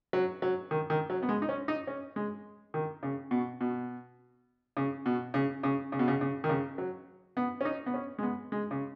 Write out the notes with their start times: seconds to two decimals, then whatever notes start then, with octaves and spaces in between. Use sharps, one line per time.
0.13 F#3
0.42 F#3
0.71 D#3
0.90 D#3
1.10 F#3
1.23 B3
1.29 G#3
1.42 D#4
1.49 C#4
1.68 D#4
1.87 C#4
2.16 G#3
2.74 D#3
3.03 C#3
3.31 B2
3.61 B2
4.77 C#3
5.06 B2
5.34 C#3
5.63 C#3
5.92 C#3
5.99 B2
6.08 C#3
6.21 C#3
6.44 D#3
6.49 C#3
6.78 F#3
7.37 B3
7.61 C#4
7.65 D#4
7.86 B3
7.94 C#4
8.19 G#3
8.23 B3
8.52 G#3
8.71 C#3